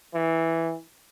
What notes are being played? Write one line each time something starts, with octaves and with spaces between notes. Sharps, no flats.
E3